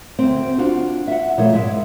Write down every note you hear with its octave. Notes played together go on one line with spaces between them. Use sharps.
D2 C4
D4 F4 F#4
E5 F#5
A#2 F3 G#3 A3 E4 C#5
G#2 G#3 E4 E5